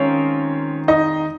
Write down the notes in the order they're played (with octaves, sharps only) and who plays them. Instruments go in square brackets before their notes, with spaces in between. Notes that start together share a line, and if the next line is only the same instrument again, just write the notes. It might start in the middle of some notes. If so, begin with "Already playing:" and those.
Already playing: [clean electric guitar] D#3 G#3 C4 F4 A#4 [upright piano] C#4 C#5
[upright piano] D#4 D#5